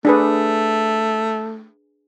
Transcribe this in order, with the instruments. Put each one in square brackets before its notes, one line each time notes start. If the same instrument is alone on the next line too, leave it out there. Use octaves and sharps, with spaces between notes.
[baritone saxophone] A3 [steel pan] D4 G#4 B4